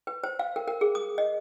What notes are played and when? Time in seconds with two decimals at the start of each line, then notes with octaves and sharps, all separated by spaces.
0.07 B4
0.24 C5
0.39 F5
0.56 A#4
0.68 A#4
0.81 G#4
0.95 D#6
1.18 D#5